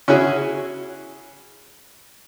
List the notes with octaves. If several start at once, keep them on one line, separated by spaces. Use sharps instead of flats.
C#4 E4 F#4 G#4